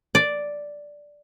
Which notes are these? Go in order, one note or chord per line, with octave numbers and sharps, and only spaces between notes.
D5